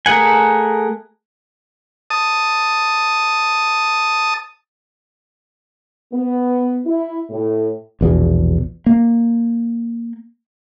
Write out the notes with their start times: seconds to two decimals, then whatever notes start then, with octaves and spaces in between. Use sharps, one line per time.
0.06 A3 G#4 A#4 F#5 G#5
2.10 A5 D#6
6.13 B3
6.86 E4
7.30 A2
8.01 A#1 E2 B2
8.86 A#3